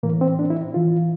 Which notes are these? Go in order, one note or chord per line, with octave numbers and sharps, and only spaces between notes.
A2 E3 A#3
C4
D4
E4
A2 E3 F4